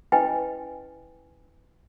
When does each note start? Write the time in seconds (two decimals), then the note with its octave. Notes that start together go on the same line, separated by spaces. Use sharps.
0.12 C#4 E4 B4 D#5 G5 G#5